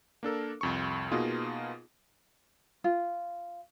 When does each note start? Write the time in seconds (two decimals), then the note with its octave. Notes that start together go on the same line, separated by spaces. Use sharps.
0.23 A#3 D4 A4 A#4
0.61 C2 F2 C#6
1.11 B2 A#3 B3 D#4 F4 G#4
2.84 F4